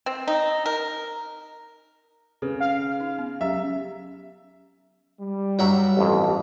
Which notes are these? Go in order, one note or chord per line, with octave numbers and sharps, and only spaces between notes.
C4
D#4
A#4
C#3 B4
F5
D#4
B3
F#3 C#4 G4 E5
G3
G2 F#3 E5 F#5 G5 A#5
A1 F2